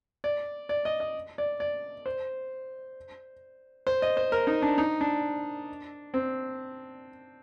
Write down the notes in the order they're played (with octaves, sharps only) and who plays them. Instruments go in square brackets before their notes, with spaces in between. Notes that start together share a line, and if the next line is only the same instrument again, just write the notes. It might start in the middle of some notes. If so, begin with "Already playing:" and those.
[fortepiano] D5
D5
D#5
D#5
D5
D5
C5
C5
D#5
C5
A#4
D#4
D4
D#4
D4
C4